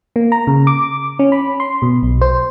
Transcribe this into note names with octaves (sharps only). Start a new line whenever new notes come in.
A#3
A#5
C#3
D6
C#4
B5
C6
B2
B1
C5